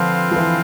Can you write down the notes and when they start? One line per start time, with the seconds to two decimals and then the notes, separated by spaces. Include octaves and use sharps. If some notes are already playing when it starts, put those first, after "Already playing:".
Already playing: D3 F3 C4 F4 B4 F5
0.31 F3
0.36 E3